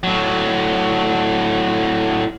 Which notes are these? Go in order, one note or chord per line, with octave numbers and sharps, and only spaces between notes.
A2 F#3